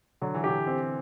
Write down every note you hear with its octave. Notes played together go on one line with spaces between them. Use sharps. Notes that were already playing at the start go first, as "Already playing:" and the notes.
D3 F#3
E3
D3 G4
C4